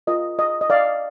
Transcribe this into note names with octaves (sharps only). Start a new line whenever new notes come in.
F4 A#4 D#5
D#5
D#5
D5 F5